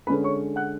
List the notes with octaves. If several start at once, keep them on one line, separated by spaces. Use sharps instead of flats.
D3 G#3 C#4 B4 B5
C#5 C#6
F#5 F#6